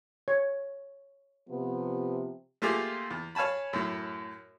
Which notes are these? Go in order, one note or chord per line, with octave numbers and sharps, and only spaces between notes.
C#5
C3 F3 B3
A3 A#3 F4 G4 G#4
E2
C#5 F5 G#5 A5 B5
F#2 A2